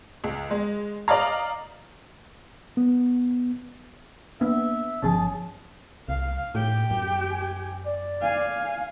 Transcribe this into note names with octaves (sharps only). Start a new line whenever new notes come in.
C#2
G#3
D5 D#5 F5 A#5
B3
A#3 B3 D4 E5
G1 B2 F3 C#4 G#4 A5
C2 F5
A2 G4 G5
F#2
G#5
D5
F5 G#5